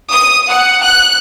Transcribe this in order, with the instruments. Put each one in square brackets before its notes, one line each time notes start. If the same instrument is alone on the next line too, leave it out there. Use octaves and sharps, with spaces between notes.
[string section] D#6
F#5
F#6